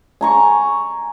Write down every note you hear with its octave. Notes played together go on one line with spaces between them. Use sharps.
G#5 A#5 C#6